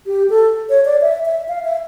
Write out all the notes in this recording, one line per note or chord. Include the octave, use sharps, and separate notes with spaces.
G4
A4
C#5
D5
E5
E5
F5
E5